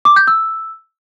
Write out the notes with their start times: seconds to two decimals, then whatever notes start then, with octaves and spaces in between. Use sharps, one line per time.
0.05 D6
0.16 G6
0.27 E6